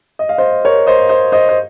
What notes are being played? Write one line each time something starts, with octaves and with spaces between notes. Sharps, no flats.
D#5
F5
C5 D#5
A#4 C#5
C5 D#5
C5 D#5
C5 D#5
C5